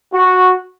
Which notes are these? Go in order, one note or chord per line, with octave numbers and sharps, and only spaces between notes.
F#4